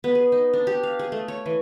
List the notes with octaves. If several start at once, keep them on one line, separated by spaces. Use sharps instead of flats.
B3
G#4
D#4
D4
G4
F5
G#4
A3
C#5
E3